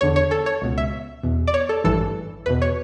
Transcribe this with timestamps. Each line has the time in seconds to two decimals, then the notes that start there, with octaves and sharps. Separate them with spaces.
0.01 E2 D3 C#5
0.16 C#5
0.31 A4
0.46 C#5
0.62 C#2 B2
0.78 E5
1.23 E2 B2
1.47 D5
1.54 C#5
1.69 A4
1.84 A1 G2 E3 A4
2.46 E2 B2 B4
2.62 C#5